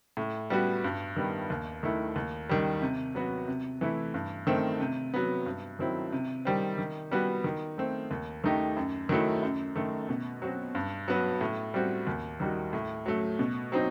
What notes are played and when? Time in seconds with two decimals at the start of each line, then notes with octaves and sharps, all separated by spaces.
0.17 A2
0.50 G3 B3 F#4
0.84 G2
1.16 D#3 G3 B3
1.50 D#2
1.83 D#3 A3 E4
2.16 D#2
2.49 D#3 G3
2.82 C3
3.15 F#3 B3 F#4
3.48 C3
3.81 E3 A3 E4
4.14 G2
4.47 D#3 A3 C4
4.80 C3
5.14 F#3 B3
5.46 G2
5.79 D#3 F#3 C4 E4
6.12 C3
6.45 D#3 G3 C4
6.78 D#3
7.11 G3 B3 F#4
7.44 D#3
7.78 A3 C4
8.11 D#2
8.44 D#3 A3 D#4 G4
8.77 F#2
9.09 D#3 F#3 A3 E4
9.42 F#2
9.76 D#3 A3
10.09 B2
10.42 F#3 C4 F#4
10.75 G2
11.08 F#3 B3 F#4
11.41 A2
11.74 G3 C4 F#4
12.07 D#2
12.40 D#3 G3 D#4 F#4
12.73 A2
13.06 F#3 A3
13.39 B2
13.72 F#3 C4 D#4